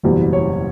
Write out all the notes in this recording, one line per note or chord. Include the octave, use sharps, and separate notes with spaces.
F#1 E2 B2 G3
C#5